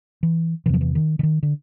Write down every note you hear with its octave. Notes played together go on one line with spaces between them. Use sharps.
E3
E2 C3 E3 F3
E3
D#3
D3
D#3
D3